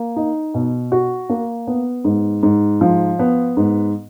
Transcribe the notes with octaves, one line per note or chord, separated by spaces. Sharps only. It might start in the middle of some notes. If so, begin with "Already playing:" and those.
Already playing: A#3
D#4
B2
F#4
A#3
B3
G#2
G#2
F3
B3
G#2